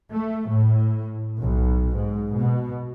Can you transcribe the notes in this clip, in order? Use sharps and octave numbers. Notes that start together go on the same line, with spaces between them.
A3
A2
B1
G#2
B2